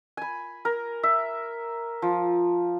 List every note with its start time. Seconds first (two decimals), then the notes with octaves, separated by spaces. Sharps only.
0.17 G#5 B5
0.65 A#4
1.03 E5
2.02 F3